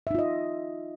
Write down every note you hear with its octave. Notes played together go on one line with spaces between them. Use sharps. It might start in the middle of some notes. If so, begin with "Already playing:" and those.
D#4 F4 D#5 E5